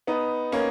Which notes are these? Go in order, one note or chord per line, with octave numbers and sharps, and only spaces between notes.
B3 D#4
A#3 C#4